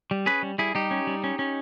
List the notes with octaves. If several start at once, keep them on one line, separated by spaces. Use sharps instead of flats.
G3
C#4 G#4 B4
G3
G3 E4 G#4
G3 D#4 G4
C#4
G3
C#4
C#4